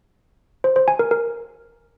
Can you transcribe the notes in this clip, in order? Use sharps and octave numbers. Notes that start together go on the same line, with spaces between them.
C5
C5
G#5
A#4
A#4